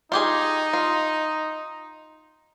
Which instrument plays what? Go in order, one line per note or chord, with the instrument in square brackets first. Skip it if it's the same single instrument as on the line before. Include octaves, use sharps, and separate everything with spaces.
[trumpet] D#4 [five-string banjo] F4 G4 G#4
[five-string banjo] F4